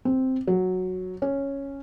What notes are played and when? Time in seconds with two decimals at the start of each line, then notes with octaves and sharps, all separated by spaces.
0.05 C4
0.47 F#3
1.22 C#4